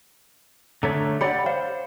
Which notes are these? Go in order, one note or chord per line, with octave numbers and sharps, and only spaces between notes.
D3 A3 C#5 A#5
G4 C#5 D5 F#5 B5 C#7
C5 F5